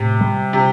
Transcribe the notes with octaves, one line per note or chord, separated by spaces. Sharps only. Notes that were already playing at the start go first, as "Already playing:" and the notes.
Already playing: A2 C3
G3
C3